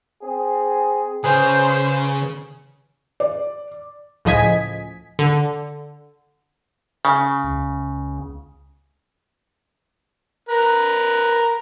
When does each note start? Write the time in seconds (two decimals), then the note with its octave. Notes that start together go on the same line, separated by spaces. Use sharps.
0.22 C4 G#4
1.24 C#3 G#4 B4 C5
3.20 D5
4.25 C#2 A2 F3 D#5 G#5 B6
5.19 D3
7.05 C#3
7.44 C#2
10.49 A#4 B4